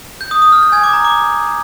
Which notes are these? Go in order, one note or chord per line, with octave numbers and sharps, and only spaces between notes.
G6
D#6
D#6
F6
G6
G#5 G#6
D6
A#5
D6